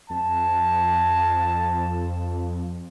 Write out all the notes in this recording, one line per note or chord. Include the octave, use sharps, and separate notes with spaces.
F2 A5